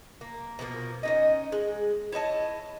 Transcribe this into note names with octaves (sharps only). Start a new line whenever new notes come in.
A#3
B2 F3 A3 A#3
C#4 D#4 D#5
G#3
E4 C#5 D#5 A5